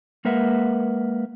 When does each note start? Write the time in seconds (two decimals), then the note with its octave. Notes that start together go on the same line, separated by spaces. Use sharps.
0.25 G#3 A#3 A#4 B4 E5 F#5